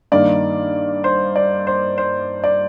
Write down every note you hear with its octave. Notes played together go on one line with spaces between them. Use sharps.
G2 D#3 A#3 D5
C5
D5
C5
C5
D5